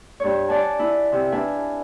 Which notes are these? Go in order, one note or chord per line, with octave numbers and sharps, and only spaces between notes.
G2 C#5
D5 F#5 G#5 A5
E4
C3
D4 B4 E5 F5 G#5